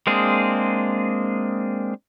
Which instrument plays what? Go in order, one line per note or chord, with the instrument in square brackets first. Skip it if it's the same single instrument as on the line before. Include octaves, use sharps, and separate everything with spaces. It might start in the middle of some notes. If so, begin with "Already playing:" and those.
[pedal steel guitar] G#3 A#3 C4 D4 G#4